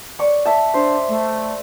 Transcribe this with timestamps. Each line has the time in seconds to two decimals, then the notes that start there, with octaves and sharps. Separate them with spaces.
0.19 C#5 D5 C#6
0.46 E5 A5
0.74 D4 C5
1.09 A3